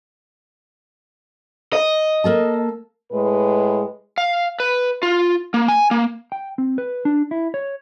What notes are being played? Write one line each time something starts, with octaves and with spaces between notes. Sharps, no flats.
D#5
A#3 A4 A5
A2 G#3 B4
F5
B4
F4
A#3
G#5
A#3
G5
C4
B4
D4
E4
C#5